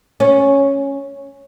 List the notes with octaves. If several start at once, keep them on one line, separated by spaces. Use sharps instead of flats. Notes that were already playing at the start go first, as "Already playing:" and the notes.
C#4